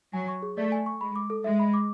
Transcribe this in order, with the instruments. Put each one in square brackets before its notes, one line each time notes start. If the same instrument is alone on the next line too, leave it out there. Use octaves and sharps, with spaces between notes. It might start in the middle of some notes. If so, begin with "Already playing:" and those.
[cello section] F#3 [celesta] G#5
[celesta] C#6
G#4
[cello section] A3 [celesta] D5
[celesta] G#5
C#6
[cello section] G#3 [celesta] B5
[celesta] D6
A4
[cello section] G#3 [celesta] E5
[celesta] B5
D6